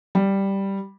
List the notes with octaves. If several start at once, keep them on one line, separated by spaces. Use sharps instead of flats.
G3